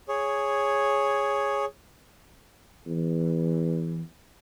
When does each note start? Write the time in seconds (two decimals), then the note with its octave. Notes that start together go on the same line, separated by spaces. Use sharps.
0.08 G#4 C#5
2.87 E2 E3